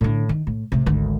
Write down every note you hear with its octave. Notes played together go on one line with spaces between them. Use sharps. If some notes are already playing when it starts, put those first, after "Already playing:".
A2 D3
D#3
A2
A2 C3
G#1 D2